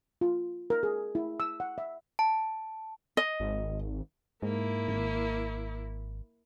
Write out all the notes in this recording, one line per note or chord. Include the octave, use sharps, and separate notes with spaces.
F4
A#4
G#4
E4
E6
F#5
E5
A5
D#5
G#1
G#2 A#3 E4
G#1